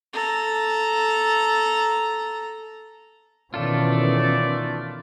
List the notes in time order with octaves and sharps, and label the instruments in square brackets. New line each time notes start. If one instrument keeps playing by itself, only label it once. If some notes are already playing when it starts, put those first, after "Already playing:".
[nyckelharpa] A4 A#5
[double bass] B2 C#4 [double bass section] D#3 E3 [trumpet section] A3 D5 [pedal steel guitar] F4 A4